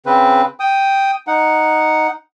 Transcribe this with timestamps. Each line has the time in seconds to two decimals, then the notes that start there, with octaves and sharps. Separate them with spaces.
0.06 C#3 C4 B4
0.60 G5 D#6
1.27 D#4 F#5